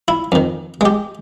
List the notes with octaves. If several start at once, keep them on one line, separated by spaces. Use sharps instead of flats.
E4
F2 D#3
G#3 G4